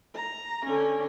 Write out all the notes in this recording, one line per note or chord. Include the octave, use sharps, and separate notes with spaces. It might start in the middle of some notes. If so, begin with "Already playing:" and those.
A#5
D3 C#4